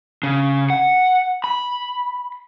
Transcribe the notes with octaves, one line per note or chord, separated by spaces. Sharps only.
C#3
F#5
B5